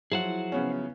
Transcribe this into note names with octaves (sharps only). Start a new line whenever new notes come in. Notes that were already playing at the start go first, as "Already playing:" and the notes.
F3 F#3 E4 G#4 C5 F#5
C#3 B3 C#4